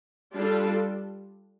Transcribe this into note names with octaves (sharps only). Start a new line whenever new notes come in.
G3 D4 F4 A4